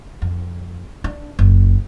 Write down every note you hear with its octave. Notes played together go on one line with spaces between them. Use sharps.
F2
D4
F#1